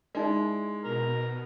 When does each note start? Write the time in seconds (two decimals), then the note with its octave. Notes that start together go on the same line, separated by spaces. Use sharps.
0.15 G#3 D#4 E4 D5
0.84 B2 A#4